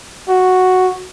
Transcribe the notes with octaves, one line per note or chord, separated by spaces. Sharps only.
F#4